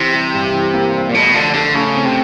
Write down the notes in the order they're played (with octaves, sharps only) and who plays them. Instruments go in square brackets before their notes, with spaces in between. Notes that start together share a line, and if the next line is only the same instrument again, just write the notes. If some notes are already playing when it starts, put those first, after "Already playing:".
Already playing: [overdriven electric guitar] C3 [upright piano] E3
[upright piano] G3
G2
E3
A#3
G3
[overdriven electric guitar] A#2
[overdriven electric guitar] B2 [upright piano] A3
[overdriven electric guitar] D3 [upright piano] F3
[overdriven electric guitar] D3 [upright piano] A3
[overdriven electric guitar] C#3 [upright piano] A3
[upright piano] C4
[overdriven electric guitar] C3